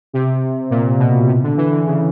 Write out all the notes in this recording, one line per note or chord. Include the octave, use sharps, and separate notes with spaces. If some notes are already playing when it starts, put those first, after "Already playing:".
C3
A#2
B2
C3
D3
E3
D3
C#3